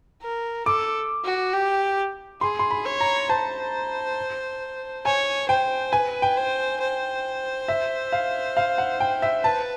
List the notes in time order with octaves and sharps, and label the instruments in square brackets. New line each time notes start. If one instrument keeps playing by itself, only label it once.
[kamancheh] A#4
[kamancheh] A4 [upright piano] D6
[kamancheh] F#4
G4
[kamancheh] G#4 [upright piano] C6
[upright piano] C6
B5
[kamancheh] C#5
[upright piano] A#5
[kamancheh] C5 [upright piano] A5
[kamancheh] C#5 [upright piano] G#5
[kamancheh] C5 [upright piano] G5
[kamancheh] B4 [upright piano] G#5
[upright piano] G5
[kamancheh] C5
C5
[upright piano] E5
F5
F5
F#5
G5
E5
[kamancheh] B4 [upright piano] A5